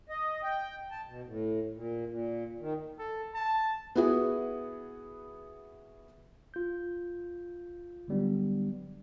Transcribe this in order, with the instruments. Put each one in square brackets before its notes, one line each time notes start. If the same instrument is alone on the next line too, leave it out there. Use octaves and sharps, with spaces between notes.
[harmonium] D#5
G5
A5
B2
A2
A#2
A#2
D#3
[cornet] A4
A5
[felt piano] B3 E4 F#4 G#4
[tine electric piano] F4 G6
D3 F#3 G3 B3 D4